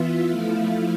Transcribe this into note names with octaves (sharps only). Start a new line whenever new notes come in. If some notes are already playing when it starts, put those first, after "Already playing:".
Already playing: E3 B3 F4 E5
F3 A3 E4 F5